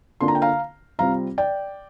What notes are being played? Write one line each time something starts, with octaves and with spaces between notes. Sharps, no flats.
D3 A#3 D4 F4 C6
A#5
G5
F5 A#5
C3 G3 C4 F4 F5 A#5
D5 G5